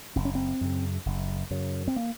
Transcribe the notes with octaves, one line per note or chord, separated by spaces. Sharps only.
F#1 C4
C#4
C4
F#2 C#3
F#1
F#2 C#3
C4
A#3